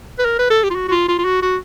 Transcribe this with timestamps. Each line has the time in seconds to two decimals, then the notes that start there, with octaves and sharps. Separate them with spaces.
0.19 B4
0.25 A#4
0.39 B4
0.50 A4
0.63 G4
0.70 F4
0.75 F#4
0.88 F#4
0.91 F4
1.08 F4
1.18 F4
1.25 F#4
1.42 F#4